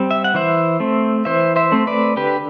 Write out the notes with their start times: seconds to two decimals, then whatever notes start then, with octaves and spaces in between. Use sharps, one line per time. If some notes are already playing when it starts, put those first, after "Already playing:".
Already playing: G3 C4
0.11 E5
0.24 F#5
0.34 E3 C5 E5
0.80 A3 C4
1.25 E3 C5 E5
1.56 C5 E5
1.72 A3 C4
1.87 B4 D5
2.17 D3 G4 B4